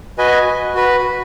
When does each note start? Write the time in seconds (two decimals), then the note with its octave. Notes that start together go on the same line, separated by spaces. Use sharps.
0.18 F#4 B4 D#5 G#5
0.75 F#4 B4